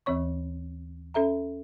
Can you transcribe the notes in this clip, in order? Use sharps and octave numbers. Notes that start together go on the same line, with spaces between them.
D#2 E3 C4 C#5 C#6
C#4 A4 E5 A#5